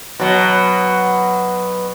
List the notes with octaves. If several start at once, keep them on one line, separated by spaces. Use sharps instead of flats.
B2 F#3